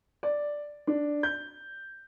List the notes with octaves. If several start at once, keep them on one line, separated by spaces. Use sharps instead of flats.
D5
D4
G6